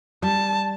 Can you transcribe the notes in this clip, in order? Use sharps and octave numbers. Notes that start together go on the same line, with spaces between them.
G3 A5